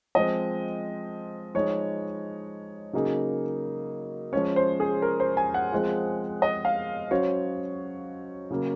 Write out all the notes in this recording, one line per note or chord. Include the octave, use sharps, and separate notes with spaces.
F3 G#3 C4 D#5
F3 G#3 D#4 C#5
C#3 F#3 A#3 D#4 G#4
F3 G#3 C#4 C#5
C5
G#4
A#4
C5
G#5
F#5
F3 G#3 C4 F4 G#4
D#5
F5
F#3 C#4 F#4 C5 C#5
C#3 F#3 A#3